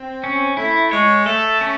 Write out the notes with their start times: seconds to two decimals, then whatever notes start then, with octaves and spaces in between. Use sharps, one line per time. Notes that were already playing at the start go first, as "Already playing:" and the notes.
Already playing: C4
0.24 C#4
0.57 A3 E4
0.91 G#3 C#5
1.26 A3 A4
1.61 C#4